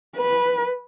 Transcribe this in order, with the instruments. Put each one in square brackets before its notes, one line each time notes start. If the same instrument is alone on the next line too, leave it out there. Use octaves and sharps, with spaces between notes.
[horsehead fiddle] B4